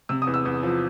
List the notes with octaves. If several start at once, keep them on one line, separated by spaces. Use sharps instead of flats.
C3 E6
D#6
E2
E6
E2
F3